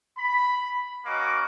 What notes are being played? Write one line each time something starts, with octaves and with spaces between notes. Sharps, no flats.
B5
A#3 C#4 F#4 D#5 D6